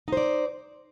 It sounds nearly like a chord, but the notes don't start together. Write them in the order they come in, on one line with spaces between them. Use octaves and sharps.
D#4 C5 D5